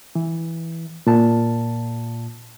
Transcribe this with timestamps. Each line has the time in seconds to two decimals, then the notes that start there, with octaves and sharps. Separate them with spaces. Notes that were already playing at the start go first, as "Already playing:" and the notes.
0.15 E3
1.07 A#2 A5